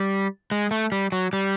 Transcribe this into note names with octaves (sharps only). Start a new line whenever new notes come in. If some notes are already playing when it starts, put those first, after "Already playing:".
Already playing: G3
G#3
A3
G3
F#3
G3